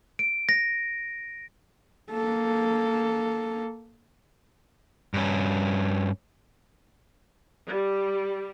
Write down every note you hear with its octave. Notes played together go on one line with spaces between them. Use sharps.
D7
A#6
A#3 A4
G2 C#4
G3